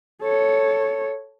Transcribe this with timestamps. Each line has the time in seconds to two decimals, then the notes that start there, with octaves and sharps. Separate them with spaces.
0.22 A4 C#5